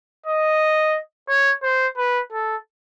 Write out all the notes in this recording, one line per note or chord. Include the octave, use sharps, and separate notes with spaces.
D#5
C#5
C5
B4
A4